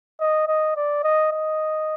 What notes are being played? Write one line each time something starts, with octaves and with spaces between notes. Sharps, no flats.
D#5
D#5
D5
D#5
D#5